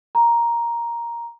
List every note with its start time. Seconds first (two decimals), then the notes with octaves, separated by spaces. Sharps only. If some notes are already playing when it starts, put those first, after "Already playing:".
0.15 A#5